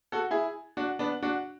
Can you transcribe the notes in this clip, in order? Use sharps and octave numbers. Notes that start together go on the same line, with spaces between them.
F#4 A4
E4 G#4
D4 F#4
B3 D4
D4 F#4